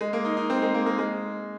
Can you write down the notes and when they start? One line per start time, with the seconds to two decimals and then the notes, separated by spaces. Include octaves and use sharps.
0.01 G#3
0.13 A#3
0.25 D#4
0.37 D#4
0.50 C4
0.62 G#3
0.74 A#3
0.86 A#3
0.98 G#3